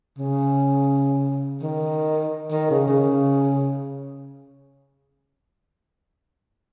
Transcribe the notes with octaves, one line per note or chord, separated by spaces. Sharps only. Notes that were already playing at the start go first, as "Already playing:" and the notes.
C#3
D#3
D#3
C#3
C#3